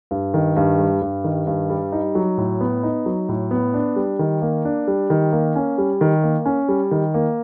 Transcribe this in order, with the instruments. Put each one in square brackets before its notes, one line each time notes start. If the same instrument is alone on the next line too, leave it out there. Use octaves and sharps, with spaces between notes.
[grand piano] G2
D#3
G2
G3
G2
D#3
G2
G3
D#4
F#3
A2
B3
D#4
F#3
A2
B3
D4
G3
D#3
A#3
D4
G3
D#3
A#3
C#4
G3
D#3
A#3
C#4
G3
D#3
A#3